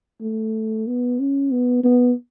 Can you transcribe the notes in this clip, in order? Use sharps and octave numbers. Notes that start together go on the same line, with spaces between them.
A3
B3
C#4
B3
B3